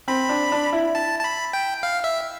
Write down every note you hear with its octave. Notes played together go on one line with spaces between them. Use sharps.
C4 B5
D4
D4
E4
A5
A5
B5
G5
F5
E5